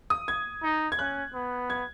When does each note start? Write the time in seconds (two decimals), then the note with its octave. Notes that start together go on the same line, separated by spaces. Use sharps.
0.10 D#6
0.28 G#6
0.63 D#4
0.92 G#6
0.98 C#4 F#6
1.34 B3
1.70 G#6